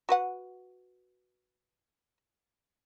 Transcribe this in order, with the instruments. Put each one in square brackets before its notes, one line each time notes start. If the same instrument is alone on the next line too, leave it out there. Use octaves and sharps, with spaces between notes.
[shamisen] F#4 B4 F#5